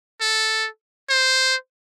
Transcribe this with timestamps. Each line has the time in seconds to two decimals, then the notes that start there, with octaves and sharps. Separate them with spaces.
0.21 A4
1.09 C5